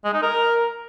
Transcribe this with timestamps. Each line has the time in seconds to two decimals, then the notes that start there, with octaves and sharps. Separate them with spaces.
0.05 G#3
0.14 D#4
0.22 A#4